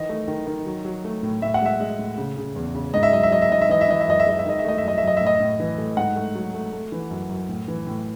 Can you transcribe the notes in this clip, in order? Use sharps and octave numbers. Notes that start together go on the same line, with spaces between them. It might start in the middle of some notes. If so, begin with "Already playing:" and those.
Already playing: D#3 E3 D#5
A3
D#3
D#3
F#3
F#3
A3
A2
A2 E5
F#5
G#3 E5
G#3
A2
C#3
C#3
E2
C#3
G#2 D#5
E5
F#3 D#5
E5
F#3 D#5
E5
G#2 D#5
E5
E3 D#5
E5
E3 D#5
E5
F#2 D#5
E5
G#3 D#5
E5
D#3 D#5
E5
A3 D#5
E5
F#2 D#5
F#2 E5
D#5
A2 E5
D#5
A2
E3
A3
G#2 F#5
A3
F#3
A3
A3
E3
F#2
F#2
A2
E3
A2